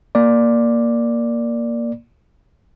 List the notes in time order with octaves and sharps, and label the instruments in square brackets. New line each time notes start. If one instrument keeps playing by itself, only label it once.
[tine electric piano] A#3 D5